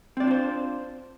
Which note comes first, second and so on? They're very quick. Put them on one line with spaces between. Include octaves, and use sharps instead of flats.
C4 D5 D4 F4 C5